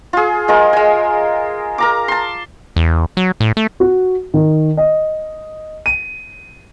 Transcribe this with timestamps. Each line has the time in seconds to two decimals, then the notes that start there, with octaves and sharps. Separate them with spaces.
0.13 F4 G#4
0.48 G#3 F4 A#4
0.73 G#3 G#5
1.78 A#4 A#5 D6
2.08 A5 C6
2.76 E2
3.17 F#3
3.40 A2
3.57 A3
3.80 F#4
4.34 D#3
4.77 D#5
5.86 D#7